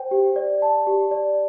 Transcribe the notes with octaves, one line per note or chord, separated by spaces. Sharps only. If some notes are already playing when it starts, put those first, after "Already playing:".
Already playing: C5 G5
G4
D5
A5
G4
D5